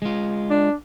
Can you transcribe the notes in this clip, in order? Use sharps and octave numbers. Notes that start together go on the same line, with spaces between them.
G#3 F4
D4